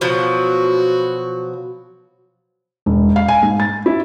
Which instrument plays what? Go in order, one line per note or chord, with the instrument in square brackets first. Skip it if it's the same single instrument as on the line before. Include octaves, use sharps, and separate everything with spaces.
[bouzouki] B2 F3 F#3 [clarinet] F#4
[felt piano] E1
F5
G#5
G#2
A6
E4